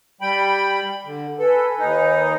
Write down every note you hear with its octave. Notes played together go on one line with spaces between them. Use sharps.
G3 G5 B5
D3
A4 B4 G#5
D#2 D#4